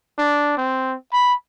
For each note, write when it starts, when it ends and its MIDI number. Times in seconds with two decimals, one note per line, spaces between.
0.18 0.57 62
0.57 0.95 60
1.12 1.33 83